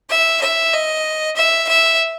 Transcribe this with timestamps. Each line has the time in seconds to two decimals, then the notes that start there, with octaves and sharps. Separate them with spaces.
0.10 E5
0.42 E5
0.73 D#5
1.36 E5
1.69 E5